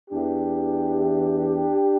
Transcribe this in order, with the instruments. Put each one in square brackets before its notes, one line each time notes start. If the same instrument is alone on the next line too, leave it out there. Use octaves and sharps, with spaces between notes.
[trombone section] E2 E3 D4 G4